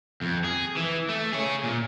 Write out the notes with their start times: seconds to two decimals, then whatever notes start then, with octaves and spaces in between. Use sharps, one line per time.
0.21 F2
0.44 G#4
0.77 E3
1.09 A3
1.33 G#4 C#5
1.64 A#2